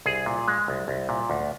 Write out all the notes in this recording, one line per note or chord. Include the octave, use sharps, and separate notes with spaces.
C2 G#4
A#2
G#3
C2
C2
A#2
D2